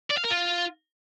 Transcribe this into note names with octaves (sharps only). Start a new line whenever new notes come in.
D5
F5
A#4
F4